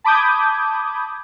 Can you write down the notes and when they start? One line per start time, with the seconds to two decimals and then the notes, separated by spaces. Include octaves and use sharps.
0.04 A5 B5 D6 D#6 G6 G#6